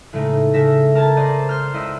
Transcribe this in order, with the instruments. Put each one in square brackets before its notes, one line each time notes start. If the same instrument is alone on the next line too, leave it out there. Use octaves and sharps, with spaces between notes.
[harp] A2 C#3 G#3 A3 D#4
C#3 A4 E5 A#6
A#4 A5 A#5 G#6 A6
C5 D5 D#5
C5 F6
C#2 E4 D#5 E6 D7